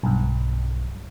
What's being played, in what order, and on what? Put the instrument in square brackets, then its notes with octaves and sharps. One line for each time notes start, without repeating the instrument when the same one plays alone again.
[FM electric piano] B1 G2